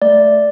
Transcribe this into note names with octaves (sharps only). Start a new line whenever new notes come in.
A3 D5